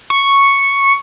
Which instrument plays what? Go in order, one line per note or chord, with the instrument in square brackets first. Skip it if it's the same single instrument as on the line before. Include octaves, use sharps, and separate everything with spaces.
[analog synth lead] C#6